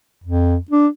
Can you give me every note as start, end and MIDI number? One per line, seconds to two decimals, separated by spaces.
0.24 0.56 41
0.71 0.87 62